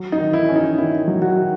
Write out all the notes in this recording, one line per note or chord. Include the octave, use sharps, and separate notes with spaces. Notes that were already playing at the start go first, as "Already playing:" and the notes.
Already playing: F#3
D#4
D#3
E4
C#4
D#4
D#3 E4
F#3
F#4
D#3